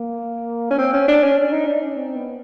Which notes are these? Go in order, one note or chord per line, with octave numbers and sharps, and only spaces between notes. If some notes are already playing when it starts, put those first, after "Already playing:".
Already playing: A#3
C#4
C4
C#4
D4
C#4
D4
D#4
D4
C#4
C4
B3